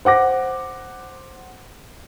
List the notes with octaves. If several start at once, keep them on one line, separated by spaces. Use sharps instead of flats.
C5 F#5 D6 A#6